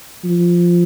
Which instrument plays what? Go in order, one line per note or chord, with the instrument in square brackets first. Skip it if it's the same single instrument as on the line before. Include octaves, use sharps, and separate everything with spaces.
[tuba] F3